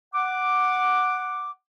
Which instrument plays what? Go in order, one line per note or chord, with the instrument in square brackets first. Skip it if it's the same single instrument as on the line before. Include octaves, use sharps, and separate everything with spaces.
[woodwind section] F#5 D6